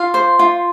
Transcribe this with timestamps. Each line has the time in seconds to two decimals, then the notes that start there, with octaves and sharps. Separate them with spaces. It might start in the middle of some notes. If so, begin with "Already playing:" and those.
Already playing: F4 F5
0.14 C5
0.39 F4